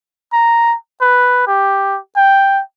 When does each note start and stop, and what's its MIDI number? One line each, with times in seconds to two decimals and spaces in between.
0.33 0.76 82
1.01 1.43 71
1.47 1.99 67
2.17 2.62 79